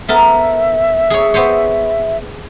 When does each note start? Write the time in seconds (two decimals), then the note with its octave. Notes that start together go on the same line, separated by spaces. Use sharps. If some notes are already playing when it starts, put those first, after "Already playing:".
0.08 B3 A4 A#4 E5
1.10 G#4 C#5
1.34 B3 C5 C#5